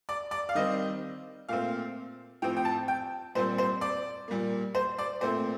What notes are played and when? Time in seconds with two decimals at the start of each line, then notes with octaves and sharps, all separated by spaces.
0.09 D5
0.31 D5
0.49 F5
0.55 D#3 G3 C4 D#5
1.49 A#2 A3 C4 F5
2.42 A2 F3 C4 G5
2.57 G5
2.65 A5
2.88 G5
3.35 A#2 G3 C4 C5
3.58 C5
3.81 D5
4.28 A#2 G3 A#3
4.75 C5
4.98 D5
5.21 A#2 A3 C4 C5